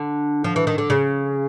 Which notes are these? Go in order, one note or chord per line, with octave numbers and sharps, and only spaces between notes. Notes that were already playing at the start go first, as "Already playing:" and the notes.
Already playing: D3
F3
E3
D#3
D3
C#3